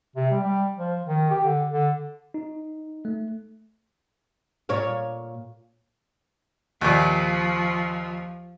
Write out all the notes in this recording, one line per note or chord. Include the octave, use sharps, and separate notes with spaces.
C3
G3
G3
F3
D#3
G4
D3
D3
D#4
A3
A#2 C#5 F5
D#2 A#2 F3